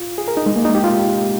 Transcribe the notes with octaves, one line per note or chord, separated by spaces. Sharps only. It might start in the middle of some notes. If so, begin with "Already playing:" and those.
Already playing: F4
G#4
A#4
D#4
G#3
A#3
D#4
G4
F4